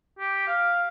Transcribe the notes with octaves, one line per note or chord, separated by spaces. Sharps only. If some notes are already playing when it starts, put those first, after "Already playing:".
G4
F5